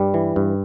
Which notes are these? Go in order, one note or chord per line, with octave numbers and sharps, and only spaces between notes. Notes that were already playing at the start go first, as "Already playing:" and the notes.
Already playing: G2 G3
E3
G2